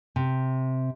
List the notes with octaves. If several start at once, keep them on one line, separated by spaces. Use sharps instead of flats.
C3